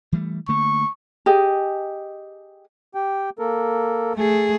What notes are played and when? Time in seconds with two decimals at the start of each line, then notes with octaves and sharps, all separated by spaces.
0.12 E3 G3 A3
0.48 D3 A3 A#3 C#6
1.26 G4 G#4 D#5 G#5
2.95 G4 G5
3.39 A#3 A4 A#4
4.15 A3 G#4